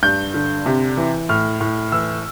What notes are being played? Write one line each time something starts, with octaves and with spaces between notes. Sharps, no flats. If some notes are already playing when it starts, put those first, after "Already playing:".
G2 G6
D3
C3
E3
A2 F6
A2
E3 E6